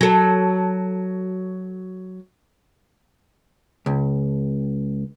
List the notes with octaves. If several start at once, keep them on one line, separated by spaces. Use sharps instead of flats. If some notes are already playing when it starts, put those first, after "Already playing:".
F#3 A4
C#2